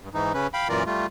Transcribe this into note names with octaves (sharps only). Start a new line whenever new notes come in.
G2
G#2 E3 D#4
C#3 C#4 B4
F5 G5 B5
F#2 A#2 E3 F4 A#4 D5
G3 A3 F4